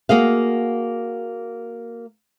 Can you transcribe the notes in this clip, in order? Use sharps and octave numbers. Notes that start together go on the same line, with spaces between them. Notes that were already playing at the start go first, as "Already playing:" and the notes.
A#3 F#4 G#4 F5